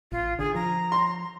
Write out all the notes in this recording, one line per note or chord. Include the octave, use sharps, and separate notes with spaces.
A1 F4
D3 G#4
F3 A#5
C6